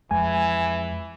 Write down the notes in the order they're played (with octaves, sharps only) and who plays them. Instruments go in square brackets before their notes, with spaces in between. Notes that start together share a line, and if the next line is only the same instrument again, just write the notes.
[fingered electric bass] F2 G#3 [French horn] E3 [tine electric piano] G#5